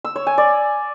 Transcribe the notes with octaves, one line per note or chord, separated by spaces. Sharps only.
E6
C#5
G#5
D5